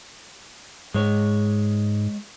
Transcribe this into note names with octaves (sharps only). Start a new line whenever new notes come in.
G#2 G#3 C#5